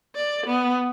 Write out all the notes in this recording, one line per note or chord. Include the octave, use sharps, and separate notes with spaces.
D5
B3